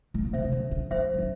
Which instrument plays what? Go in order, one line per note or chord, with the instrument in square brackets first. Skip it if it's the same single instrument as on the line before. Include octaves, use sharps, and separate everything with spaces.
[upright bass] A2
A#2
[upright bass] C3 [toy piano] C5 E5
[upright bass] C3
D3
D3
[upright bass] F3 [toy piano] C5 E5
[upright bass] F3
E3